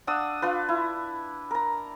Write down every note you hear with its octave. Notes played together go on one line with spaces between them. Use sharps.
D4 F#5 D#6 E6
D4 F4 B4
E4
A#4 A#5